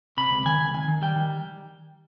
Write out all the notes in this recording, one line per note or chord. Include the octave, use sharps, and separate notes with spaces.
C3 B5
C#2
D#3 G#5
C#2
D#3 G#5
D#3
G3 G5
D#3